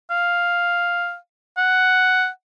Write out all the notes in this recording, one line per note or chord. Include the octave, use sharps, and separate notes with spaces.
F5
F#5